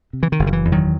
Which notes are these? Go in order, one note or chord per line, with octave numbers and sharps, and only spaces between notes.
C3
E3
D#3
F#1
D#3
E3
E2
D#3 F#3